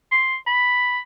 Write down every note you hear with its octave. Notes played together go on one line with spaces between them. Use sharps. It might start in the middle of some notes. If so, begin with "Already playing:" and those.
C6
B5